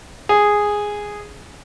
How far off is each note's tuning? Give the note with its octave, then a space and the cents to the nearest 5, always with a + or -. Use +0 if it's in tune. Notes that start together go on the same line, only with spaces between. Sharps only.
G#4 -5